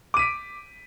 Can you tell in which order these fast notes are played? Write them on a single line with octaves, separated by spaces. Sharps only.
D6 D#7 B6 D7